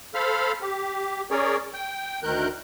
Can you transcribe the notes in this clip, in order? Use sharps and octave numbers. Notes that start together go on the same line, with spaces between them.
A4 C5 F5 B5 F6
G4
C#4 G#4 A#4 C#5 D5
G5
D2 D#3 A#4 F#6 G6